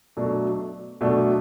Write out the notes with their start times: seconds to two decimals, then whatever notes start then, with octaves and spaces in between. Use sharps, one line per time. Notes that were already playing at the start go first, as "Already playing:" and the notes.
0.17 B2 F#3 A3 D4
1.01 B2 F#3 A3 D4